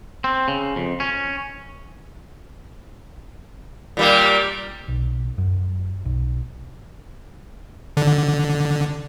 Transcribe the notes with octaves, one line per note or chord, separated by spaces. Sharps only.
C4
C#3
F2
C#4
A#2 G3 A#3
B1
F#2
B1
D3